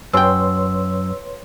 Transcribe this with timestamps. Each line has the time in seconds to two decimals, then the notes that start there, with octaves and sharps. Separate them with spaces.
0.13 F#2 B4 C#5 G5 C6 E6